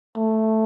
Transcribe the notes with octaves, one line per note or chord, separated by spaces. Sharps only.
A3